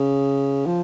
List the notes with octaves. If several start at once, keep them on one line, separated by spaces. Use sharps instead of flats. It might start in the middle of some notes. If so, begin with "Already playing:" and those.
Already playing: C#3
F3